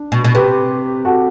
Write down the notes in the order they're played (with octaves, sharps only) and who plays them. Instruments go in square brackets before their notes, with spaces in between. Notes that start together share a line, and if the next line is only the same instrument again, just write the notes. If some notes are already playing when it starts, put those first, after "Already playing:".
Already playing: [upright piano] D4
[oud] B2
B2
[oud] C3 [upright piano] G4 B4
[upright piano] F#4 A4